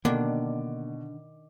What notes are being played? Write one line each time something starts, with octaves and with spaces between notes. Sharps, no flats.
B2 D3 D#3 A#3 D4 D6